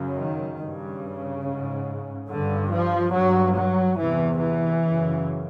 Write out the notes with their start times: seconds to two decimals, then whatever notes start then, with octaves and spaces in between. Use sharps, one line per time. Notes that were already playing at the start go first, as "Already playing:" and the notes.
Already playing: F#2 C#3
0.16 D#3
0.59 G2 C#3
1.44 G#2
2.29 G2 D3
2.71 F3
3.13 G2 F#3
3.55 F#3
3.98 E2 C3 E3
4.40 E3
4.83 F#2 C#3